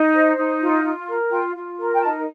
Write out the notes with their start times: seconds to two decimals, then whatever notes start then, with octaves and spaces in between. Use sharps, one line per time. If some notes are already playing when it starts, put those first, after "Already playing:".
Already playing: D#4 D#5
0.13 C5
0.37 D#4
0.61 F4
0.83 F4
1.07 A#4
1.30 F4 G5
1.55 F4
1.78 A#4
1.94 G5
2.02 D#4 A5